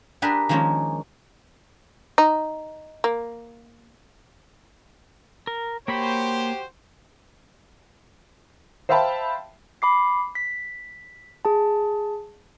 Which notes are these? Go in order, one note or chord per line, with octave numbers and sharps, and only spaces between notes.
D4 G4 G#4 A#4 B4
D#3 F3 G#3 A#3 C#4
D#4
A#3
A#4
A#3 F#4 G4 C5 C#5 B5
C5 E5 F5 G5 A5 B5
B5 D6 C7
B6
G#4 A5